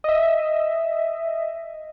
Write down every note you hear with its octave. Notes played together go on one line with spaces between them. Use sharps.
D#5 E5